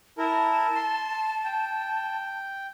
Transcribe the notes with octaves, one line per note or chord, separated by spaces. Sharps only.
E4 A#4 A5
C6
G5